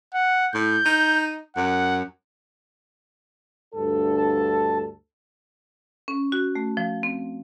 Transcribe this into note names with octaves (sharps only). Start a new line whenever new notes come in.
F#5
A2 G6
D#4
F#2 F#5
D2 G2 A4
A5
C#4
F#4
A3
F3
C4